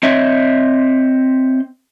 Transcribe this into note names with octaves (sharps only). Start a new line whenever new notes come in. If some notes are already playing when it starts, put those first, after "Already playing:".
C4 C#5 D#5 E5